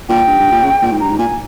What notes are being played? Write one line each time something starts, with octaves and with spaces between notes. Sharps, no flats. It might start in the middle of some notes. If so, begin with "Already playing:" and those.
A#2 G5
G2
G2
A#2
C#3
A#2
G#2
G2 A#5
G#2
A#2 G#5